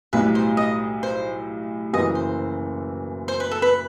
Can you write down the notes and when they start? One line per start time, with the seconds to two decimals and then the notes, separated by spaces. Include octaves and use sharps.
0.13 B1 A2 G3 B4
0.35 C5
0.57 D#5
1.03 C5
1.93 F#1 F#2 E3 D#5
2.15 C5
3.28 C5
3.40 B4
3.51 A4
3.62 B4